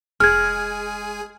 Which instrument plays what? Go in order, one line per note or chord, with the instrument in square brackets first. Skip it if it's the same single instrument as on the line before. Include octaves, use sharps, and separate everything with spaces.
[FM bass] F1 [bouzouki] G#3 [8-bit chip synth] G#4 G#5 [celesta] F6 G#6